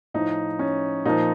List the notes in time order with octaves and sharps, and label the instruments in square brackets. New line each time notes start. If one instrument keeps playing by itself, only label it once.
[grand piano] A2 F3 D#4
C#4
A#2 F3 D#4